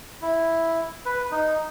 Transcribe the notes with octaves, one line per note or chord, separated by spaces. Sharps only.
E4
B4
D#4